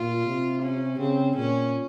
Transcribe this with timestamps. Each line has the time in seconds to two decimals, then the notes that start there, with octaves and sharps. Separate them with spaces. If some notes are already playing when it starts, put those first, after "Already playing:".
Already playing: A#2 F4
0.26 C3
0.62 C#4
0.99 C#3 C4
1.36 A#2 C#4